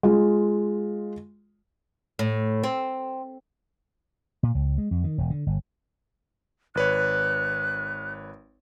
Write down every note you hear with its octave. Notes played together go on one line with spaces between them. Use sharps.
G#3 F4
A2
C4
A#2
C#2
G#3
F2
D#3
E1
D3
G1
G#1 B4 C#5 F#6